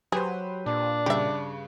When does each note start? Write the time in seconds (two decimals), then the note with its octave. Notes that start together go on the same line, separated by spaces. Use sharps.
0.12 F#3 G4 G#4 B4 C5
0.66 A#2 D4
1.06 G2 C#3 G4 E5